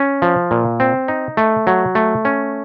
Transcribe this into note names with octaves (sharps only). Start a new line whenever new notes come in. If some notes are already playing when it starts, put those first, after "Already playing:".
Already playing: C#4
F3
A#2
C4
D#4
A3
F#3
A3
C#4